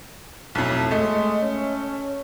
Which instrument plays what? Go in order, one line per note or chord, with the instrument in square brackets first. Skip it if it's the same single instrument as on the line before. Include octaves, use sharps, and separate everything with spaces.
[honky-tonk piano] B1 F2 [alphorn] A2
[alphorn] G#3 [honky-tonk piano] A3
[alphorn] C#4